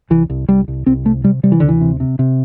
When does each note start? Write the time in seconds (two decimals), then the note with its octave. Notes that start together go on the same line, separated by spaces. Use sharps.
0.10 C2 E3
0.30 C2
0.48 C2 G3
0.68 C2
0.86 C2 C4
1.05 C3 A3
1.24 C3 G3
1.43 C3 G3
1.52 E3
1.60 D2 D3
1.69 E3
1.81 C3
2.00 C3
2.19 C3